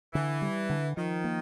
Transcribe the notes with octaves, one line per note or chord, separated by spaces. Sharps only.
D3 E3
G3
D3
D#3 F3
A#3